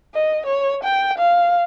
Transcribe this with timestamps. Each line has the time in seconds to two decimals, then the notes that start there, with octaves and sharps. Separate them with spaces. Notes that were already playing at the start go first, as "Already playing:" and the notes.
0.14 D#5
0.46 C#5
0.83 G5
1.18 F5